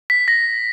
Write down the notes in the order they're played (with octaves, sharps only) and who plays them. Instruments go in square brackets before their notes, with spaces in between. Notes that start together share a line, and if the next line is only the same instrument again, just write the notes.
[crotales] B6
A#6